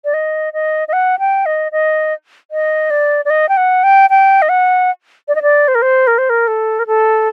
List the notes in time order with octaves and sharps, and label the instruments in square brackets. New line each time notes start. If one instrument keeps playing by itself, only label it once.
[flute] D5
D#5
D#5
D#5
F#5
G5
D#5
D#5
D#5
D5
D5
D#5
G5
F#5
G5
G5
D#5
F#5
D5
D#5
D5
C5
A#4
C5
A#4
C5
A#4
A4
A#4
A4